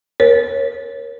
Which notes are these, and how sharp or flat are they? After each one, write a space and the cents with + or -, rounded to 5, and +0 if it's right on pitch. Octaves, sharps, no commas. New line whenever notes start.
A#4 +25 C#5 -20